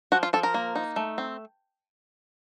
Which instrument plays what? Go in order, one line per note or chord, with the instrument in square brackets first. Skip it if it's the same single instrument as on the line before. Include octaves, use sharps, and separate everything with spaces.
[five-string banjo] F3 F#4
F4
F3 A4
A#4
A#3
D#4
A3
C4